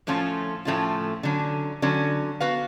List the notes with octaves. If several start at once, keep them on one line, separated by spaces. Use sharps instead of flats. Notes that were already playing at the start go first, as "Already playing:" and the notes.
A2 F3 A3 C#4 F4
A2 F3 A3 C#4 F4
D3 F#3 C#4
D3 F#3 C#4
B3 F#4 B4 F5